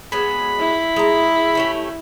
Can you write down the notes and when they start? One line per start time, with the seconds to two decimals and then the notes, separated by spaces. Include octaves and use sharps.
0.12 F#3 G#3 B3 B5
0.60 E4
0.96 G#3 A#5
1.55 A3 C#4 G4